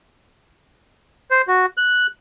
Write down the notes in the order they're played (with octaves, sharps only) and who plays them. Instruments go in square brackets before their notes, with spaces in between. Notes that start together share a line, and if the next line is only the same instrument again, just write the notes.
[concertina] C5
F#4
F#6